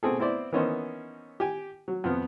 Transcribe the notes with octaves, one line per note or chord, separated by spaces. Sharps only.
B2 C4 G#4 A4
B3 C4 E4 C5 D5
E3 A#3 B3 C#4 D#4 C5
G4 G#5
F#3
F2 F3 B3